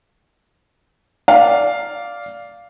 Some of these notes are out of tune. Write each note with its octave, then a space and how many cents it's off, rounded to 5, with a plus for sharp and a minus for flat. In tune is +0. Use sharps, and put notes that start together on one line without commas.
D5 -10 F5 +0